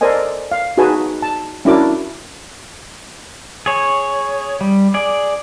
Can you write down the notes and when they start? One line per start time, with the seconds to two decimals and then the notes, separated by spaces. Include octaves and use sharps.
0.01 A4 A#4 C5 D5 D#5 G#5
0.52 F5
0.77 D#4 F#4 G#4 B4 G#5 A5
1.22 A5
1.65 C#4 D4 E4 F#4 A#4 D6
3.66 G#4 C#5
4.61 G3
4.94 G#4 D5